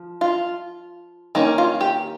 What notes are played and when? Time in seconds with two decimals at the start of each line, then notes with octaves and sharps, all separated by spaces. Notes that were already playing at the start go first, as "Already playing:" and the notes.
Already playing: F3
0.21 F4
1.35 D#3 A#3 C#4 D#4
1.58 F4
1.81 G4